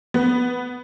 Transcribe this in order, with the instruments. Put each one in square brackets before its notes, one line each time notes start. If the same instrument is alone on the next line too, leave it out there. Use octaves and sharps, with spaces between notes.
[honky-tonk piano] B3